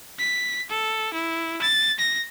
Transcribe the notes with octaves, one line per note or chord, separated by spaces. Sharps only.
B6
A4
E4
A6
A#6